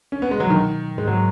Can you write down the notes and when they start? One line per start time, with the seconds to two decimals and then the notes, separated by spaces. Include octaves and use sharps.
0.12 C#4
0.22 B3
0.31 G#3
0.40 F#3
0.50 B2 D#3
0.98 G#2 G#3
1.07 F#3